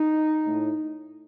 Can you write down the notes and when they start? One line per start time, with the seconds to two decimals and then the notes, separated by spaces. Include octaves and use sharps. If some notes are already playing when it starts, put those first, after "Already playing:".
Already playing: D#4
0.47 A2